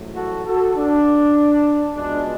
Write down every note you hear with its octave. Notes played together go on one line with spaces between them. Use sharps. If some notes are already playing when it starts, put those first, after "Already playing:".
Already playing: A1 G#2 F#3 A3
F#4 A4
F#4 A4
D4
C#2 B2 G#3 D4